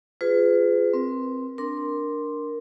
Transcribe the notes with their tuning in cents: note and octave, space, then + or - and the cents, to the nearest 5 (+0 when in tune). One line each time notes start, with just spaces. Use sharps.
F4 +0 G#4 +0 B4 +40
C4 +0 A#4 +40
D4 +0 A#4 +0 C6 +0